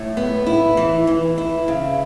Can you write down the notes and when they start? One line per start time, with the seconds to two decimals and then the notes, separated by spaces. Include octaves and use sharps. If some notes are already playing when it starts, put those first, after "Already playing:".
Already playing: A2
0.17 B3
0.46 E4
0.77 E3
1.07 E3
1.38 E4
1.68 C#3